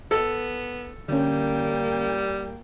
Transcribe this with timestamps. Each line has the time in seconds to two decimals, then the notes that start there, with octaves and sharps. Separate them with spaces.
0.11 B3 A4
1.09 D3 G3 A#3 C#4 G5